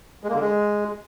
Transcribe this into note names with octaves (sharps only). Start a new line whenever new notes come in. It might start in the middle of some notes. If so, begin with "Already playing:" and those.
G#3
A#3
D3
G#3